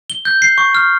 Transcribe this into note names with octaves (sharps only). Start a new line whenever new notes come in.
G7
G6
C7
C#6
F6